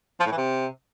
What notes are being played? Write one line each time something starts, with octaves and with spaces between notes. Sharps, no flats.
F3
A2
E3
C3